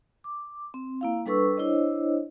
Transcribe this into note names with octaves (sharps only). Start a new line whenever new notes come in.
D6
C4
A#3 E4 F5
G3 D4 A4 B4 C#6 E6
D4 E4 C5 C#5 D#5